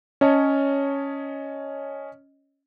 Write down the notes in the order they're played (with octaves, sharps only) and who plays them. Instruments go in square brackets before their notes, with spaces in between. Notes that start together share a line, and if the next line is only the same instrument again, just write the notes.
[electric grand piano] C#4 C#5 D#5 A5